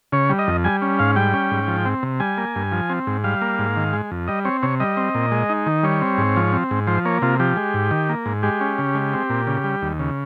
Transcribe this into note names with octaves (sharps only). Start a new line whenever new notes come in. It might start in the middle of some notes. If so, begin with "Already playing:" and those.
C#3 C#5
G3
D#5
F2
G3 G#5
C#4
G#2 F5
G3 G5
C#4
G#2
F3
C4
C3
G3 G#5
A#3
G2
F3
C4
G#2
G3 F5
A#3
G#2
D#3
G#3
F2
G3 D#5
C4 C#5
C3 C#5
G3 D#5
C4
A#2
G#3
D#4
D#3
G3 C#5
C4
G#2
F3
C4
G#2
F3 C5
A#3 C#5
C3 F4
F3 G4
G#3
G#2
D#3
A#3
G#2
G#3 G4
C#4
C#3
G#3
C4
A#2
C#3
G3
D#2
C#3